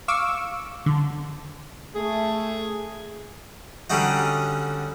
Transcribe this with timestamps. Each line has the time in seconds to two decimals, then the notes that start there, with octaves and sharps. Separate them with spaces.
0.08 F5 C#6 D6 E6
0.86 D3
1.95 A3 G#4
3.90 D3 G3 C#4 D#4 F#4